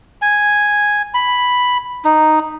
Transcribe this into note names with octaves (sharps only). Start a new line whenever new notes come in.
G#5
B5
D#4